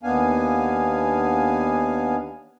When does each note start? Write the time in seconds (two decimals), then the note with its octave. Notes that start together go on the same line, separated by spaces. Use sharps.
0.03 D#2 B3 D4 F5 G#5